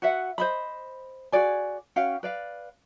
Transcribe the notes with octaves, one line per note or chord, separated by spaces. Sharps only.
F#4 B4 E5 F#5
C5 D#5 B5
F#4 G#4 D5 G#5
C#4 F#4 F5 G5
B4 D5 F5